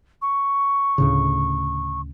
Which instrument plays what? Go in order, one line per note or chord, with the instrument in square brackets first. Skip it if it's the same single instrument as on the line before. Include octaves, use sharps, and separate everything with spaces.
[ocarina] C#6
[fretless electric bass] D2 A2 C#3